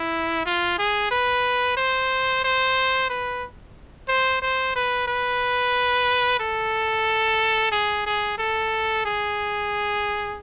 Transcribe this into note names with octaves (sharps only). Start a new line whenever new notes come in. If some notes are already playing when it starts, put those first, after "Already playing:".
Already playing: E4
F4
G#4
B4
C5
C5
B4
C5
C5
B4
B4
A4
G#4
G#4
A4
G#4